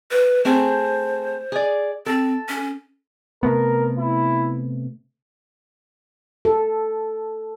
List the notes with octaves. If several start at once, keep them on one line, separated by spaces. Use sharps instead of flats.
B4
A3 C4 G#4 C5
G#4 D5
C4 A4
C#4
C3 A3 B3 A#4
E4
A4